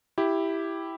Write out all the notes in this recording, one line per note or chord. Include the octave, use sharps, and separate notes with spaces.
E4 G4